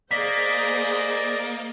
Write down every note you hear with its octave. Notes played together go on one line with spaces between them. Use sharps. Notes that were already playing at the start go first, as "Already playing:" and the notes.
A#3 G#4 C5 D5 D#5 B6